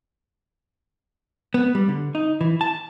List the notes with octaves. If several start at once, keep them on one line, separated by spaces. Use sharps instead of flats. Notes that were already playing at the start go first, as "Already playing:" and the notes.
B3
G3
D3
D#4
E3
A5